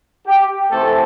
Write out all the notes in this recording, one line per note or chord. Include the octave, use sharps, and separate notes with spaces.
G4
C3 E3 A3 C4 A4